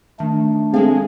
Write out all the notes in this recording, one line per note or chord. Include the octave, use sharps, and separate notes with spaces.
D#3 A3 D4
G#3 C4 G#4 A4 F5